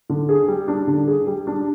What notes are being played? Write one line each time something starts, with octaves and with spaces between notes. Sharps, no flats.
D3
G#4
G3
D4
D3
G#4
G3
D4